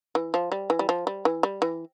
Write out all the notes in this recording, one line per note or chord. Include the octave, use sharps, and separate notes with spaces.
E3
F3
G3
E3
G3
F3
G3
E3
G3
E3